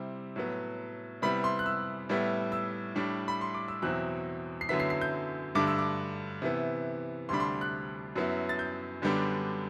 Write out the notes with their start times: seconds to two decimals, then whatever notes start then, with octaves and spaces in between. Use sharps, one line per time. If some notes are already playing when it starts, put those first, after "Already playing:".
Already playing: C3 G3 C4 E4
0.36 A2 F#3 B3
1.22 C3 G3 B3 E4 B5
1.44 C6
1.59 F#6
1.66 E6
2.09 A2 G3 B3 E4
2.52 E6
2.95 A2 G3 D4
3.28 B5
3.41 C6
3.55 D6
3.68 E6
3.82 E2 B2 F#3 C4 E4 F#6
4.61 C7
4.69 F#2 D3 F#3 B3 E4 B6
4.80 C7
4.90 C7
5.01 G6
5.55 G2 D3 A3 D4 D6
5.67 E6
5.79 D6
6.42 C3 E3 B3 E4
7.29 D2 C3 G3 D4 B5 C6
7.40 C6
7.61 F#6
8.16 F#2 F#3 B3 E4
8.49 A6
8.59 G6
9.02 F#2 D3 G3 B3 D4